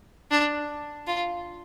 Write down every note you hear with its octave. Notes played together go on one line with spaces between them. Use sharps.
D4
F4